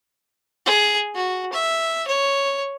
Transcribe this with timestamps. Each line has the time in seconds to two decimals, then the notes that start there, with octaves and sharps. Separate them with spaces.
0.66 G#4
1.15 F#4
1.53 E5
2.08 C#5